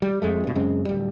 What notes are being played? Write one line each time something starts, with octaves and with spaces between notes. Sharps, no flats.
G3
F2 G#3 A3
G2 B2
F#2 C#3 G#3 C4
D1 G3